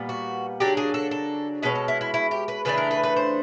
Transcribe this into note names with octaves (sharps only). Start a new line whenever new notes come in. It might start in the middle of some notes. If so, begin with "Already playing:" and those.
Already playing: A#2 G3 B3
F#4
C#3 F#3 A#3 D4 G4
G#4
A4
A4
B2 G#3 C#4 B4
A4
E4
E4
E4
G4
B4
C#3 E3 A3 D4 B4
A#4
B4
B4
C5